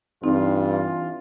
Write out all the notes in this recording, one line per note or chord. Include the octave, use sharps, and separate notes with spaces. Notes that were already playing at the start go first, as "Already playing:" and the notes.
G2 E3 C4 D4 D#4 F4